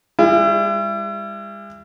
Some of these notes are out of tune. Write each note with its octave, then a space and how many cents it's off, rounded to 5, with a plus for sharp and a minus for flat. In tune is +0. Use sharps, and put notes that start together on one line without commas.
G#3 -45 E4 +40